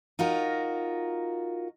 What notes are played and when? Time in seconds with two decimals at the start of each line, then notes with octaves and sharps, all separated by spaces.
0.19 D#4 F4 F#4 A#4